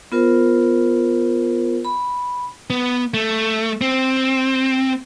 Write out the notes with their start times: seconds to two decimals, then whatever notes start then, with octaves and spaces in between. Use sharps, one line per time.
0.12 B3 F4 A#4 C5
1.85 B5
2.70 B3
3.14 A3
3.81 C4